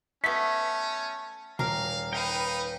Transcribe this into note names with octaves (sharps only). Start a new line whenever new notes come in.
A3 B3 C#4 B6
D#1 A#4 F5
D#4 B4 F5 G5